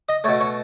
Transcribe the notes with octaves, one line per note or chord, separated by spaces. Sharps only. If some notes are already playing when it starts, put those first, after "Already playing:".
D#5
B2 A3 C#5
C#5